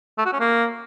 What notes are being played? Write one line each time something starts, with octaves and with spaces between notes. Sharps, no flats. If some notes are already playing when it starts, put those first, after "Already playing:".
A3
F#4
C#4
A#3